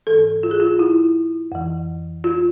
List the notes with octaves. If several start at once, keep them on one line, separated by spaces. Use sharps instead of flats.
G#2 E3 A4
F4
G#4
F4
E4
F2 E3
F4